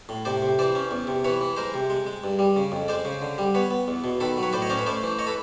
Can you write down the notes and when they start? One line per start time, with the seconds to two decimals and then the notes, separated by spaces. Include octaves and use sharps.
0.09 A2
0.25 C3 C5 D5
0.42 C3
0.59 E3 C5 D5
0.75 C#4
0.91 E2
1.07 C3
1.24 E3 B4 C#5
1.41 E3
1.57 G#3 A#4 C5
1.74 C3
1.90 G#3
2.06 G#3
2.24 G2
2.39 G3
2.57 C#3
2.72 F2
2.88 G#3 C5 D5
3.05 C#3
3.22 D3
3.38 G3
3.54 B3 B4 C#5
3.71 B3
3.88 E2
4.04 B2
4.20 D#3 A4 B4
4.37 F#3
4.43 B4 C#5
4.53 A2 C5 D5
4.62 C#5 D#5
4.70 C#4 C5 D5
4.77 B4 C#5
4.86 A3 C5 D5
5.03 E3
5.19 C#5 D#5
5.27 A4 B4